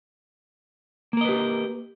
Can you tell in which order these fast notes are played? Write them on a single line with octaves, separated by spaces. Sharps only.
A#3 A#4 D#5 B4 G4